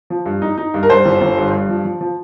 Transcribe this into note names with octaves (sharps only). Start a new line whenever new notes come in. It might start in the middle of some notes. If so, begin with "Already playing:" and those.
F3
G2
D#4
D#4
G2
A#4
G2 C5
G1
G1
G2
G2
F3
F3
F3